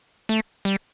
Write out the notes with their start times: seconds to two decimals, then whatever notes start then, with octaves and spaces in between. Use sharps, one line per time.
0.29 A3
0.65 G3